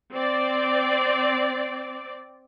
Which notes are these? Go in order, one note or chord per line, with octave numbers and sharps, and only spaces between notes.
C4 D5